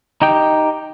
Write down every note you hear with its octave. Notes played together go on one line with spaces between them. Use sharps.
D#4 G4 G5